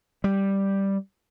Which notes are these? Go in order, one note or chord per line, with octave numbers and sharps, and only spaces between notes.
G3